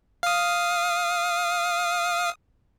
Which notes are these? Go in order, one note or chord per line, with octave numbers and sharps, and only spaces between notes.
F5 D#6